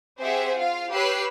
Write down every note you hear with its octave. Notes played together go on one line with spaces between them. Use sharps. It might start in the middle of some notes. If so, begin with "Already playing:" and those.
C4 G4 G#4 C5 E5 F#5
F4 F5
G4 B4 C#5 E6 F#6 C7